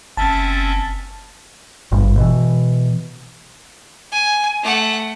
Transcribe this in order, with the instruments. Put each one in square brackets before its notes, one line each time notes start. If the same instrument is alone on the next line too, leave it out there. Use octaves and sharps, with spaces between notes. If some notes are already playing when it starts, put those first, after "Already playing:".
[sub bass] F#1 [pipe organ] C4 C#4 E5 [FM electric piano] A5 A6
[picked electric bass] G#1 G2
B2 E3
[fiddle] G#5
A3 F#5